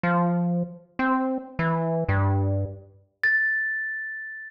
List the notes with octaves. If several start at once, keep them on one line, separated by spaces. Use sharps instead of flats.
F3
C4
E3
G2
A6